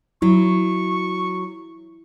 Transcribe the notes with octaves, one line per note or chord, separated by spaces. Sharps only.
F#3 E4 C#6